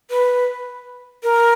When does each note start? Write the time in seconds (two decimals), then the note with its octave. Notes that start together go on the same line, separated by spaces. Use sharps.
0.10 B4
1.23 A#4